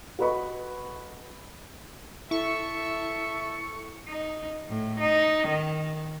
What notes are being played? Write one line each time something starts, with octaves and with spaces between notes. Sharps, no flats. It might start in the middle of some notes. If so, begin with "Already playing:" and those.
F#4 A4 B4 D#5 B5 C#6
E4 A4 E5 C#6
D#4
A2
D#4
D#3